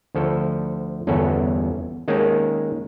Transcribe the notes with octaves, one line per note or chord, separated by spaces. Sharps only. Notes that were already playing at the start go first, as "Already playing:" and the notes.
D2 F3 A4
G1 E2 C#4 A4 B4
D#3 G#3 A#3 C#4